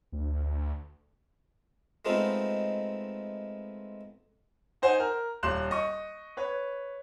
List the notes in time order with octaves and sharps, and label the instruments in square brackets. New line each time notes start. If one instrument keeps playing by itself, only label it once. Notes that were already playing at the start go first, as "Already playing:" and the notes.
[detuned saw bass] D2
[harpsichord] G#3 A3 B3 C4 D#4 F4
[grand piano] D#4 C5 F#5 G#5
A#4
D#1 C6 F#6 E7
D#5 C#6
B4 C#5